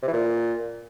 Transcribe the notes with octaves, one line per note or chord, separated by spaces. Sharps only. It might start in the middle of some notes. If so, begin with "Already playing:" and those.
C3
E3
A#2